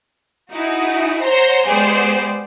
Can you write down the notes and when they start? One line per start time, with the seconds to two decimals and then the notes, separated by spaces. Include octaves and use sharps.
0.51 D#4 E4 F#4 G#4
1.21 C5 C#5 F#5 A#5
1.64 G#3 B3 G4 G#4 C5 D5